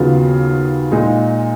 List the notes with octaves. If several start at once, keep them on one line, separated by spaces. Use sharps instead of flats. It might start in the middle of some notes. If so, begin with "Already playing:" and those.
Already playing: D#2 C#3 F#3 B3 F4
A#2 G#3 D#4